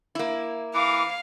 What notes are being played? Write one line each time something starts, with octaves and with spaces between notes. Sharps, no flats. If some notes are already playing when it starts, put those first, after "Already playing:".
A#3 E4
E3 F5 D6